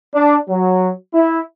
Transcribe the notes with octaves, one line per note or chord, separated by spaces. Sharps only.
D4
F#3
E4